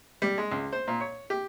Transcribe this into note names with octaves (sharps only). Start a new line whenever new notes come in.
G3
G#3
C#2
C5
A#2
C#5
G4